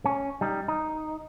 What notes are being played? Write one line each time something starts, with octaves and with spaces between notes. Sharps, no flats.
C#4
G3 D#4
D#4